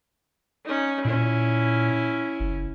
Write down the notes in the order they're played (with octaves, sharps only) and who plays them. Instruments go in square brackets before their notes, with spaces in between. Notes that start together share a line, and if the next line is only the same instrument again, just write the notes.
[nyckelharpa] C#4 D#4
[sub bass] A#2 [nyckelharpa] C#4 E4
[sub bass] F#1